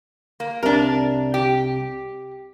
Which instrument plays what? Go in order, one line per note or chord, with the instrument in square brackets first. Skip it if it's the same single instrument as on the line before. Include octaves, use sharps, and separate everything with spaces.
[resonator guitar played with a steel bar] A#3
[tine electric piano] C2 C3 [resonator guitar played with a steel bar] D4 A#4
[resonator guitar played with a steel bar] G4